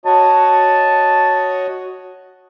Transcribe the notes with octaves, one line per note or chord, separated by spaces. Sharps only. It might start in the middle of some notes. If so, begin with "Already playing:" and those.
F#4 C#5 D#5 A5